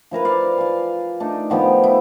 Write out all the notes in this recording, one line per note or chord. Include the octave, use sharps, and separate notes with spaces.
F3 E4 A#4 B4
D5 F5
F5 G#5
A3 D4 D#4
D#3 F3 B3 G4
E4